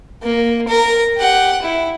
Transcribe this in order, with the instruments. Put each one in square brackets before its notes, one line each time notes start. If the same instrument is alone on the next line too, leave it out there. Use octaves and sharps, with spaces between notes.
[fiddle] A#3
A#4 A#5
G4 F#5
E4